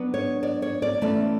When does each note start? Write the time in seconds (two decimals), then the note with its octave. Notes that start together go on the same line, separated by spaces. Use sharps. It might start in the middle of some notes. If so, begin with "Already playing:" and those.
Already playing: F#3 B3 D4
0.14 C#5
0.43 D5
0.62 C#5
0.82 D5
1.02 E3 A3 C#4 D5